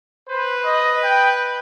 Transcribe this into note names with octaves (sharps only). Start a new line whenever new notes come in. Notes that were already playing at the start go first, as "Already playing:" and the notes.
B4 C5
D#5
G5